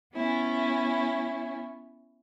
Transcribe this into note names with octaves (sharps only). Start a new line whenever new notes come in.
B3 C#4 E4